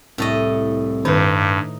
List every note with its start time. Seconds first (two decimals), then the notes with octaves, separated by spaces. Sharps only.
0.18 C2 A2 A4 D#5
1.05 G2 D#3 D#4 B4